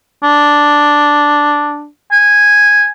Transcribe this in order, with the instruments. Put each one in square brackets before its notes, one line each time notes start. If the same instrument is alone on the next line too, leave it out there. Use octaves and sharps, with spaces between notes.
[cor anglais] D4
[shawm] G#5